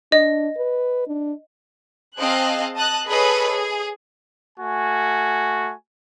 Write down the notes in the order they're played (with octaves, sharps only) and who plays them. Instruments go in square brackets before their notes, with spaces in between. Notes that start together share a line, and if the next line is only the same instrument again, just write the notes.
[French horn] D4 [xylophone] D#5
[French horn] B4
D4
[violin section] C4 G#4 D#5 F5 A5 F#6
D#5 A5 D#6 F#6
G#4 A4 B4 C#5 D#5
G#4
[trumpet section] A3 F#4 G#5